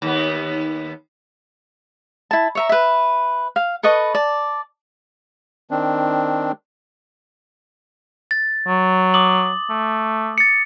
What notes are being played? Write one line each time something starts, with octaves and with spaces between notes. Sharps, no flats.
D#2 B3
E4 A5
C#5 E5 A#5
B4 E5
F5
A4 B4 D#5 C#6
D5 A5
D#3 C4 D4
A6
F#3
D6 D#6 F#7
A3
A6 C#7